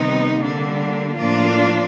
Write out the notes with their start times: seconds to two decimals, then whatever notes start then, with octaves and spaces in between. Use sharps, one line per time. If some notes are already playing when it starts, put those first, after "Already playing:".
Already playing: C3 D#3 G3 B3 D#4
0.40 D3 G3 A#3 D4
1.18 A2 F3 A#3 D4 F4